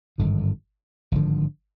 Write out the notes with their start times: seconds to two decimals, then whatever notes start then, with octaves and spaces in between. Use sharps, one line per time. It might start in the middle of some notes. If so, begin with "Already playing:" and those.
0.18 G#1 G2 D3 F3
1.12 G#1 G2 D3 F3